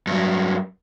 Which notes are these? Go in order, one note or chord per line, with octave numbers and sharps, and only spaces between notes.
G2 F#3